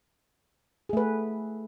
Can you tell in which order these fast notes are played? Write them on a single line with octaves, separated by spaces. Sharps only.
G#4 A3 B4